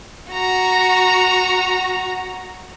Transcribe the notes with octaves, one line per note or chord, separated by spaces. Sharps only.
F#4 A#5